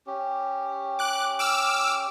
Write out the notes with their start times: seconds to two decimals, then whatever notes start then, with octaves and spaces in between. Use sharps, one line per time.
0.07 C#4 G4
0.99 D6 F#6
1.39 D6 E6 F6